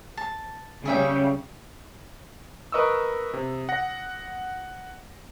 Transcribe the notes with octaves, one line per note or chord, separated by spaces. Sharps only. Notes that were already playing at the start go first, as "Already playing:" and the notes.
A5
C#3 G3 G#4 E5 G5
A#4 B4 D#5 C#6 D#6 E6
C3
F#5 A#6